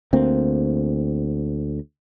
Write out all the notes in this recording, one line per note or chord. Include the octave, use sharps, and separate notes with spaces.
D2 A#3 C4